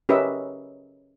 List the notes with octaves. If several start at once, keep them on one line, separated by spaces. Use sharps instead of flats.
C#4 G4 A#4 B4 D#5 E5